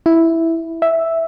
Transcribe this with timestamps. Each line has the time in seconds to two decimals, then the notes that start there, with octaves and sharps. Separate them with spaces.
0.06 E4
0.82 E5